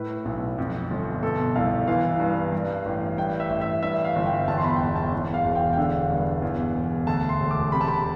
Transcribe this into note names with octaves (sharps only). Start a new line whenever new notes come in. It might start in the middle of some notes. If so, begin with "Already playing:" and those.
Already playing: A2 B4
B1
F2
G1
B2 A4
C2 F5
E3 F5
G2
G2
A1
G2 G5
E5
A1
E5
G2 E5
F5
G1
G5
E2 A5
C6
B5
G5
E1 A5
A5
E2
F5
E1
G5
G5
D3 F5
G2
E2
E1
D2 A5
C6
E1
D6
C3 B5
A5
B5